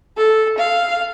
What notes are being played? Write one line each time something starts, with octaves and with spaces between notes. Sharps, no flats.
A4
F5